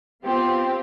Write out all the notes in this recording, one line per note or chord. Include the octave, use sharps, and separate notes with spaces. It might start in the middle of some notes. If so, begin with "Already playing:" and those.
B3 C4 F4 G4